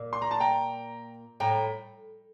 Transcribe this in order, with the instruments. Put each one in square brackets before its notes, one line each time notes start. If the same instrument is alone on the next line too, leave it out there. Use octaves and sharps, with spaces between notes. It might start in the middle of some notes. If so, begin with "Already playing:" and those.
Already playing: [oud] A#2
[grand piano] C6
A#5
A5
G5 A#5
[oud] A2 [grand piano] G5 A#5